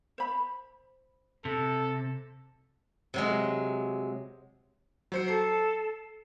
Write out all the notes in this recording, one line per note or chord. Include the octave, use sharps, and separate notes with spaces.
C5 B5
C3 A4
C3 F#3 G#3
F#3 C5 C#7
A4 C7